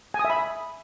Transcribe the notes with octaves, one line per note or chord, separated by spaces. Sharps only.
G#5
D#6
E5
B5